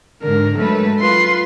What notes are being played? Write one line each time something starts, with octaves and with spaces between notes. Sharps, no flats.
G#2 D3 A#4
F#3 G#3 A3 B4
F4 B4 C6